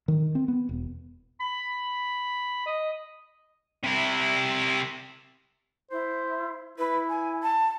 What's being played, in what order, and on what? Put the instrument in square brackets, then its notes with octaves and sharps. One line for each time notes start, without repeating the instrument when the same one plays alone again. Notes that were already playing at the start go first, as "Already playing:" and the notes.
[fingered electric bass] D#3
C4
B3
E1
[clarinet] B5
D#5
[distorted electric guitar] C3 E4
[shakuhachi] E4 [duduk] C5
[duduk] E4 [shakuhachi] B4
[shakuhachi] G#5
A5